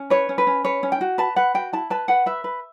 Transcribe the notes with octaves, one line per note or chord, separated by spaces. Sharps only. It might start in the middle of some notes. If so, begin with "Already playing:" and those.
Already playing: C#4
B4 C#5
C#4
B4
C#4
B4 C#5
C#4
G5
F#4
B4 A5
B4 F#5
F#4 G5
E4 A5
B4 A5
B4 F#5
B4 E5
B4